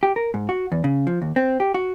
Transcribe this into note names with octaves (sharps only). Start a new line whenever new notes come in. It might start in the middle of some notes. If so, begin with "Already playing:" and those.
G4
A#4
G#2
F#4
E2
C#3
F3
D#2
C4
G4
F#4